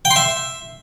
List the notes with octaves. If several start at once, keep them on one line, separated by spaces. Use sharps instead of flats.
G5
C6
E5